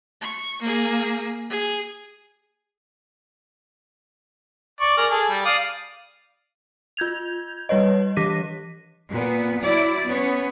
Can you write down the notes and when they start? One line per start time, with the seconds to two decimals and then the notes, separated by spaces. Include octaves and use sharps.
0.21 C#6
0.62 A#3 G#4
1.50 G#4
4.81 D5 C#6
4.98 G#4 A#4 D5
5.11 G#4 A4
5.29 G3
5.45 D5 F5 D#6
6.97 F4 G6 G#6 F7
7.69 G3 B4 C#5 D#5
8.17 E3 G4 D6 A#6 B6 D#7
9.10 A#2 B3
9.64 F#3 E4 D5
10.07 B3 C#4 C#5